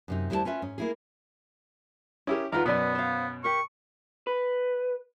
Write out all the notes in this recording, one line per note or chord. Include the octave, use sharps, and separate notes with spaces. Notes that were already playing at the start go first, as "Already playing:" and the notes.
F#2 C3 D#4
D#2 G3 E4 A4 C5 A5
C#4 F4 B4 E5
G#2 C#4
A#3 E4 G#4
C#4 E4 G4 G#4 A#4
E2 D#3 F4 A#4 B4 F#5 A#5
F#2 B2 B3 B4 D5 G#5
C5 F5
G4 A#4 C#6
B4